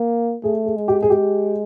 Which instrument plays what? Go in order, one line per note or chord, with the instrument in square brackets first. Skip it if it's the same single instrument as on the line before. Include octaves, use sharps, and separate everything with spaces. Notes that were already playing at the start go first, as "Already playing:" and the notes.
Already playing: [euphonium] A#3
[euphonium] A3 [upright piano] G#4
[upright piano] G#4
[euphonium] G#3
[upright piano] G4
G#4
[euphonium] G#3 [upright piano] G4